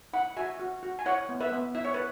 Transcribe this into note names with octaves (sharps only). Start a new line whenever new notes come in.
E4 F#5 B5
F#4 E5 G#5
F#4
F#4
G#5
E4 C#5 F#5
B3
B4 E5
B3
E4 E5
C#5
B4